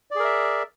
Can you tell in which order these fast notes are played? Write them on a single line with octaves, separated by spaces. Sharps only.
D5 G#4 A#4 E5